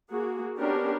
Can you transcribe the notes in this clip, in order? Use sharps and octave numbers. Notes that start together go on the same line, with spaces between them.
A#3 F#4 G#4
B3 C#4 D4 G4 A#4